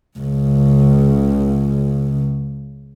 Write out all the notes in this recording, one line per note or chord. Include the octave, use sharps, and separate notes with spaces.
C#2 C#3